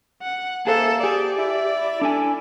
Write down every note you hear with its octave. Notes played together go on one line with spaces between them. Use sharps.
F#5
A#3 G#4 A4 C5 E5
G4 G#4 D5
E4
D4 E4 A4 G#5